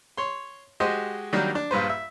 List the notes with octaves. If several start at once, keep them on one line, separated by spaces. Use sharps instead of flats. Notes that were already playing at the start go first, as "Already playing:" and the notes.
C#5 C6
G#3 F#4 G4 C5 D#5
D#3 F#3 G3 A#3 D4
D4
A#1 G2 B4 C5
E5